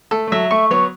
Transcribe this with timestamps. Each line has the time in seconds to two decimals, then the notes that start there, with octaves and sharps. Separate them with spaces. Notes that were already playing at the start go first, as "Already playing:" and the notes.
0.11 A3 A4
0.27 A3
0.32 F#3 E5
0.51 A3 C#6
0.70 F#3 B3 C#5